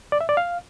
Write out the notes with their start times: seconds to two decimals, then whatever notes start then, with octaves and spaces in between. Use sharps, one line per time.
0.12 D5
0.21 E5
0.29 D5
0.37 F5